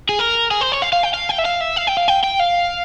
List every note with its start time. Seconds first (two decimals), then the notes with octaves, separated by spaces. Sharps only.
0.09 G#4
0.19 A#4
0.51 G#4
0.61 C5
0.72 C#5
0.82 F5
0.93 F5
1.03 G5
1.14 F5
1.29 G5
1.38 E5
1.45 F5
1.61 E5
1.77 F5
1.87 G5
1.97 F5
2.08 G5
2.23 G5
2.39 F5